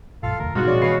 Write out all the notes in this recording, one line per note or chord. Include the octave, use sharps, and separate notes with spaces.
A#1 F#2 F4 A4 F5
E1 D2 A#4
G#2 B2 G#3 F4 F#4
A#2 F3 C#4 D5
B2 E3 A#3 G#4 B4 C#5 F5 C7